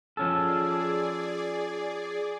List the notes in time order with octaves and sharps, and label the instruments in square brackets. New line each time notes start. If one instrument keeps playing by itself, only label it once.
[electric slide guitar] F3 C#4 A4 [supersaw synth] G#4 D5